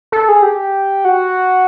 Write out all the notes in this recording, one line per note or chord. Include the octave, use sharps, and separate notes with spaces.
A4
G#4
G4
F#4